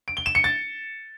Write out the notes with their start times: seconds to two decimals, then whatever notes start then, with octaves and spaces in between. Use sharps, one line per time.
0.08 D7
0.17 G7
0.26 E7
0.35 C#7
0.44 A6